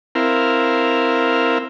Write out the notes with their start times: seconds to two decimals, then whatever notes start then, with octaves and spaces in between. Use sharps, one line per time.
0.15 C4 E4 A#4 F5